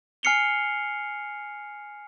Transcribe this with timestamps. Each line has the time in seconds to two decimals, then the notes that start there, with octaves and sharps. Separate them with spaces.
0.23 G#5 F6 C7 C#7 F7 G7